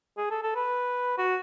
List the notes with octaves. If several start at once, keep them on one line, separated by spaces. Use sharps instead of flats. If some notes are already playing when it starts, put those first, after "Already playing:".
G#4
A4
A4
B4
F#4